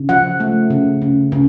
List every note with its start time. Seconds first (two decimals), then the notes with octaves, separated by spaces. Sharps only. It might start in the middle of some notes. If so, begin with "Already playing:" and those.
Already playing: C#3
0.09 F3 F#5
0.40 A3
0.70 C#3
1.02 C#3
1.32 C#3